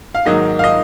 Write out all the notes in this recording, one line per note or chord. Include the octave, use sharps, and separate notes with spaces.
F5
G#2 D#3 F#3 A#3 D#5
F5
D#5